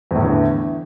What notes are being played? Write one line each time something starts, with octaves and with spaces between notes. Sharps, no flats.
E2 A2 D3 E3